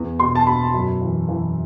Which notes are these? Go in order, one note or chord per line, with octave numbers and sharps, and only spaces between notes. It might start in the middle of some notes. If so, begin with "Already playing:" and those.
Already playing: E2
B2 C6
A5
B2 B5
F#2
E3
E3